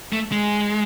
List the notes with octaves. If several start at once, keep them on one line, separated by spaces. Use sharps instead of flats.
A3
G#3